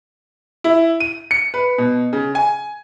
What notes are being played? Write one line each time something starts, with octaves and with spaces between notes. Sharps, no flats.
E4
D#7
C#7
B4
B2
C#3
G#5